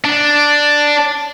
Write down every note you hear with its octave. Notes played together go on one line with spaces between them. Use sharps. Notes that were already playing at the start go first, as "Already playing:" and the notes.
D4